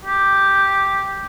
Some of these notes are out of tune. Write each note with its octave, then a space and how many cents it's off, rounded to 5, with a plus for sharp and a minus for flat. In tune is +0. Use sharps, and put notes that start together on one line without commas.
G4 +0